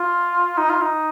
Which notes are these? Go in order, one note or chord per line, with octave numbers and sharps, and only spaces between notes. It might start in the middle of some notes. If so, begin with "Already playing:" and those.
Already playing: F4
D#4
F4
D#4